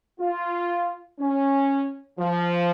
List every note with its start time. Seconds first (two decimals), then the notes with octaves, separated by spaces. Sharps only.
0.20 F4
1.20 C#4
2.19 F3